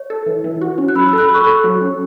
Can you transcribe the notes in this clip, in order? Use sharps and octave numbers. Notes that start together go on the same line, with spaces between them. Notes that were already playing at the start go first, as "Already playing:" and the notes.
Already playing: C#5
A4
E3
E3
F#4
C#4
F#6
F#3 B5 E6
B5 E6
A4 F#6
B5 E6
A4 C#6 F#6
A4
F#3
C#4